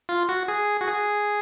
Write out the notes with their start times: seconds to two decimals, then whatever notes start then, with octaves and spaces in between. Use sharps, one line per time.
0.09 F4
0.29 F#4
0.48 G#4
0.81 F#4
0.88 G#4